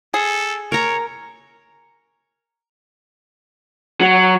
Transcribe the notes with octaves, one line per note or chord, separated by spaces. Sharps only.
G#4 A4
A#4 C#5 A#5
F#3